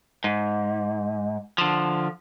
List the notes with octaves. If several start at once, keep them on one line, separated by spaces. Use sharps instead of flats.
G#2
D3 F3